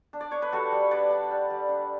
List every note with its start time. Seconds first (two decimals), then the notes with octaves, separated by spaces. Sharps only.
0.13 D4
0.21 D5
0.31 D4 C#5
0.42 B4
0.52 G3 F#4 A4
0.72 G3
0.91 D4 B4 D5
1.11 D4
1.31 G3
1.50 G3
1.69 D4